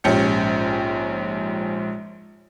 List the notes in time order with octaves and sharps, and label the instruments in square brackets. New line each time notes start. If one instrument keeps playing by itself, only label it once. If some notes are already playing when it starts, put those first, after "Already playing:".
[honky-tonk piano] A#1 G#2 C#4 G4 G6 C#7